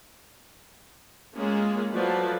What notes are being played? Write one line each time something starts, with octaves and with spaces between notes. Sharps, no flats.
G#3 A#3 C#4 F4 G#4
F3 F#3 A3 B4 D5